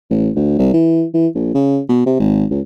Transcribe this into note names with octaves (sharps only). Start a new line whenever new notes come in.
A1
D2
C2
E3
E3
A#1
C#3
B2
C3
G#1
C#2